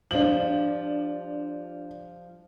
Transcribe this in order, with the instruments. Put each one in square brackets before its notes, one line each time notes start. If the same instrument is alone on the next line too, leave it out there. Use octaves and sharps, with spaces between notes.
[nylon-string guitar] F3 G3 F4 [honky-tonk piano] D4 F#7